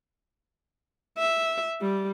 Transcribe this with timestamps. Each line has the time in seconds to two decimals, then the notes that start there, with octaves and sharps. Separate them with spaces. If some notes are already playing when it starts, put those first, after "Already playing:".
1.18 E5
1.81 G3